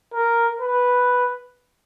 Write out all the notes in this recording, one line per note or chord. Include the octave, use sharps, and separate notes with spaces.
A#4
B4